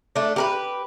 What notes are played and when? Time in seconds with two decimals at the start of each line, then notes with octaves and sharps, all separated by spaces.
0.16 A3 D4
0.36 G4 A#4 B4